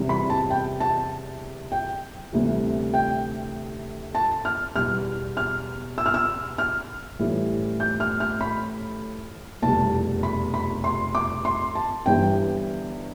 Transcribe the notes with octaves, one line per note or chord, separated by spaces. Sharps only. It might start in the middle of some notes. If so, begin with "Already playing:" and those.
Already playing: E2 C3 E3 G3
B5
A5
G5
A5
G5
D2 C3 E3 G3
G5
A5
F6
E2 B2 G3 F6
F6
E6
F6
E6
F6
A1 A2 E3 G3
G6
F6
F6
B5
F1 E2 B2 G3 A5
B5
B5
C6
D6
C6
A5
G1 G2 E3 G3 G5